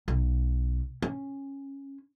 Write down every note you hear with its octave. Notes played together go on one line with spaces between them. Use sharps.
B1
C#4